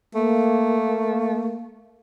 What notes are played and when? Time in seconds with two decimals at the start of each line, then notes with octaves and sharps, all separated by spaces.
0.15 A3 A#3